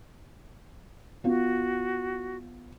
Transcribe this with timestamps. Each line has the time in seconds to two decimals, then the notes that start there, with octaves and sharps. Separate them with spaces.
1.24 B3 F4 F#4